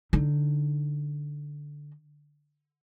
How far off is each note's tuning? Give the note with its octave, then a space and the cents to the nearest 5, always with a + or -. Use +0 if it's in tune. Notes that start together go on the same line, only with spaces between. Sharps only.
D3 +0 D#4 +0